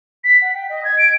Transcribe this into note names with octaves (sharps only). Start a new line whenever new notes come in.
B6
F#5
G5
D#5
G#6
D7